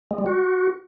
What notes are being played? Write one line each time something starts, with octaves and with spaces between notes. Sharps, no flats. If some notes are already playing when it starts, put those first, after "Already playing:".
G#3
G3
F#4